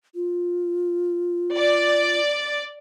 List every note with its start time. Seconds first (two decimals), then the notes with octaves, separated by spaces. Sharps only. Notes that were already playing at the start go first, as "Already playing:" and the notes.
0.15 F4
1.56 D5